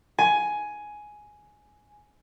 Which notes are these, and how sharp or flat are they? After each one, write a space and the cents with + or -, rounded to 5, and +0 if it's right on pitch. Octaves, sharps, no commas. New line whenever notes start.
G#5 +10